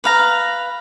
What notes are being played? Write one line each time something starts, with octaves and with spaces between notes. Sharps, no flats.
B4 F5 A#5